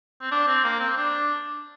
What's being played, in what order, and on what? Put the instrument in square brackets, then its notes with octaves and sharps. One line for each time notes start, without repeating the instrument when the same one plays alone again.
[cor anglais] C4
D4
C4
A#3
C4
D4